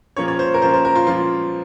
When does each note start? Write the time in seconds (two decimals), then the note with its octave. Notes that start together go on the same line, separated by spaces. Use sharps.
0.17 A#2 F3 A#3 C#4 C#5
0.28 C#5
0.39 C5
0.54 A#4
0.62 A#2 F3 A#3 C#4 C5
0.73 C5
0.85 A#4
0.96 F4
1.07 A#2 F3 A#3 C#4 F4